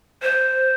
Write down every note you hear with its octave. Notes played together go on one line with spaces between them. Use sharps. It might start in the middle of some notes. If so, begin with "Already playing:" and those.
C5